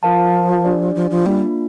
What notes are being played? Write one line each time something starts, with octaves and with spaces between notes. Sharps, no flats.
F3 F4 A#4 F5 A5
D4 G4 D5
F3
F3
G3 A#3 D4 F4